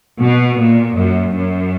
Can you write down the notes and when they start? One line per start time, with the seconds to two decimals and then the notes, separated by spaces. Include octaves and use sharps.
0.21 B2
0.58 A#2
0.97 F#2
1.35 F#2